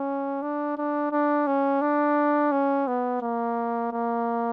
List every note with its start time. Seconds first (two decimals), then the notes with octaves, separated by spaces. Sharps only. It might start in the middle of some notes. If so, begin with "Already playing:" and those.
Already playing: C#4
0.42 D4
0.77 D4
1.12 D4
1.47 C#4
1.81 D4
2.52 C#4
2.87 B3
3.22 A#3
3.92 A#3